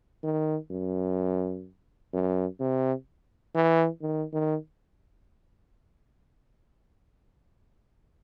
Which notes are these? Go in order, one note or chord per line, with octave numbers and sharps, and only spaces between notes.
D#3
F#2
F#2
C3
E3
D#3
D#3